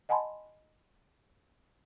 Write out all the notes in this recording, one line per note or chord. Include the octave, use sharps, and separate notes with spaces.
D#5 F#5 G#5 A5 B5 C6